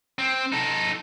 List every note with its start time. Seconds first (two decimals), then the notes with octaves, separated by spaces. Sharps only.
0.19 C4
0.53 D#4 A4